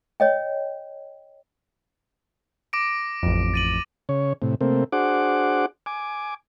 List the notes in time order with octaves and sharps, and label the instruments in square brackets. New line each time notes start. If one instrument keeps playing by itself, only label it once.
[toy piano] C#5 D#5 G5
[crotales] D6 A#6 D7
[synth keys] A1 F2
[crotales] A6 D#7 F#7
[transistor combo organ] C#3 C#5
A2 C3
C3 A3 A#3 C4
D4 F#4 G#4 C5 F#5 D6
G#5 D6